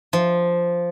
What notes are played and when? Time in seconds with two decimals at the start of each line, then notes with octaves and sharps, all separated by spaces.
0.13 F3